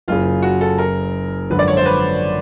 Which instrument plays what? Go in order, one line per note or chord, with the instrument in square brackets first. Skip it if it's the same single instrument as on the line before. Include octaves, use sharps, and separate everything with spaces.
[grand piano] F#1 F#2 C#3 [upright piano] F4
[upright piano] F#4
A4
A#4
[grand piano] G#1 F#2 D3 F3 [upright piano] B4
[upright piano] D5
C#5
C5
B4